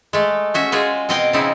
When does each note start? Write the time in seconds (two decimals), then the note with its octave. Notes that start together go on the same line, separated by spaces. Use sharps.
0.13 G#3 A3
0.54 C#4 F#4 E5
0.72 G#3 F4 F#4 G#4
1.09 B2 C4 D#5 F5 G5 G#5
1.33 C#3 F3 C4 D#4 E4